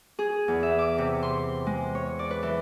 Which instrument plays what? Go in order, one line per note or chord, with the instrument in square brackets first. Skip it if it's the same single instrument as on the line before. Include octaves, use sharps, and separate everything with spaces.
[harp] G#4
E2
E5
D6
C3
C6
G#3
C#5
D5
B4
E3